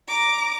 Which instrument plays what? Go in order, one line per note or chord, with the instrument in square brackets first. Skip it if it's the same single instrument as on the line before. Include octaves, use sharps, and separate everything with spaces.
[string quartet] A#5 D6